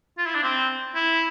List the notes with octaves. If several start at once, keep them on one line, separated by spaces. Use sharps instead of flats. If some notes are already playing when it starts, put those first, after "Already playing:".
F4
E4
D4
C4
E4